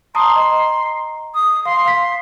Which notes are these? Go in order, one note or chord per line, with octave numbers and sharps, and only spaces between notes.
A5 A#5 C6 D#6
D#5 A#5
D#6
F5 C6
F5 B6